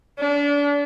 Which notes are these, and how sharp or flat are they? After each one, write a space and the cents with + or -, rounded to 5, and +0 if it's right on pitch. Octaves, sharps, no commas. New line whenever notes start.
D4 -30